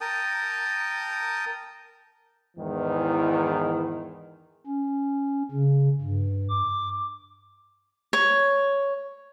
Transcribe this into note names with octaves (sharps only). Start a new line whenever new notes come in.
A#4 G5 A5 D#6
E2 G#2 D#3 E3
C#4
C#3
G2
D6
C#5